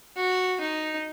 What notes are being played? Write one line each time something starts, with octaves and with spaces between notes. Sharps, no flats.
F#4
D#4